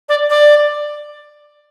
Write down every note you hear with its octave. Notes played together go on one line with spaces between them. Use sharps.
D5
D5